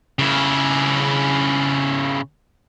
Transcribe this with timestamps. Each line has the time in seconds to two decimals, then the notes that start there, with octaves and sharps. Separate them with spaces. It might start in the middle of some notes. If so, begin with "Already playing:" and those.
0.19 C#3 E4